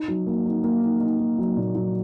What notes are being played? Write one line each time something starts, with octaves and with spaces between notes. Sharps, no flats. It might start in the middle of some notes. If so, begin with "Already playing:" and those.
Already playing: D#4
F#3
A#3
D#4
A#3
D#4
D#4
A#3
F#3
A#2
F#3